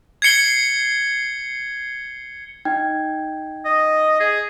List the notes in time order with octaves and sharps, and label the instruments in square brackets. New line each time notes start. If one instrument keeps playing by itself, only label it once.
[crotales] G#6 C7 C#7 G7
[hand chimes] D#4 G5 G#6
[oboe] D#5
G#4